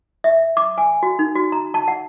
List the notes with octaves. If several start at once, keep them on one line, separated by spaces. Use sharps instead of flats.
E5
D6
G#5
F#4
D#4
F#4
A#5
A5
F#5